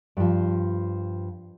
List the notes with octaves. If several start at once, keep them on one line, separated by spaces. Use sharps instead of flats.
G2 F3